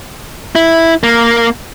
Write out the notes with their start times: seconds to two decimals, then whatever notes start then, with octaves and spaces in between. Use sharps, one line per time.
0.55 E4
1.03 A#3